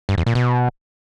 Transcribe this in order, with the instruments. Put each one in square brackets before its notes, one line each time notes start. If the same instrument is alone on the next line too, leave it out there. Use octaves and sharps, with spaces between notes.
[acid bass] G2
E2
A#2
B2